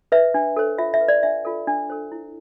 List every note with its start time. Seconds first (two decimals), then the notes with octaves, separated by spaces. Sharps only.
0.12 B4 E5
0.34 D4
0.56 A4 C5
0.78 F4 E5
0.94 E5
1.01 B4
1.08 D5
1.23 D4 E5
1.45 F4 A4
1.67 D4
1.90 A4 C5
2.12 E4